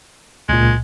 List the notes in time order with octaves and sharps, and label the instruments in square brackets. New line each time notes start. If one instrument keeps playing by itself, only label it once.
[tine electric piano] C#2 A#2 [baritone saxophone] G#3